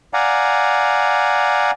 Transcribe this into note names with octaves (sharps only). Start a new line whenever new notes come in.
D5 F5 F#5 G#5 A#5